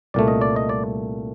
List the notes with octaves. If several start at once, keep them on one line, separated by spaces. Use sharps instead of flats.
C2 A#2 A3 D5
D#5
D5
D#5
D5